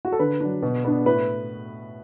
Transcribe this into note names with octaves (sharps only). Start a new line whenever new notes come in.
F#4
A4
D3 B4
F#3 D4
B2
B3 D4
A2 B4